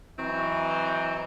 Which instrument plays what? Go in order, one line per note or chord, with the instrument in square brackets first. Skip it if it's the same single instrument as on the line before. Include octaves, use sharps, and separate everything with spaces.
[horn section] E3 F#3 C4 D#4